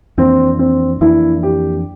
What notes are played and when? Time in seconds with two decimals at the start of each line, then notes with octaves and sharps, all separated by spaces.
0.18 F2 E3 A#3 C4 D4
0.59 C4
1.01 F2 E3 A#3 D4 E4
1.43 G4